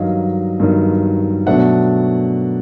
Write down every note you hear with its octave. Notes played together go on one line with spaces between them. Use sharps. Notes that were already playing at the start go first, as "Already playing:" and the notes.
Already playing: G2 D#3 F#3 D#5 F5
G2 D#3 F#3
B2 F#3 A3 D4 E5 F#5